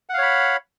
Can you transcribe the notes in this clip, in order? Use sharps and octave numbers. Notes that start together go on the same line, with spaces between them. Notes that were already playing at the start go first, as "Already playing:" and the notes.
C#5 F5 F#5 B5